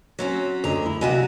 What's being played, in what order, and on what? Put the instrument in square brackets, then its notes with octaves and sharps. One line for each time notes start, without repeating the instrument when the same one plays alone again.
[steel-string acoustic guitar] F#3 C4 C#4
[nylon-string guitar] D2 D3 D#5 [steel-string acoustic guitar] A#5
[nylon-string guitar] E4
[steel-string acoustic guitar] G2 C3 F#4 [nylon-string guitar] D#5 G#5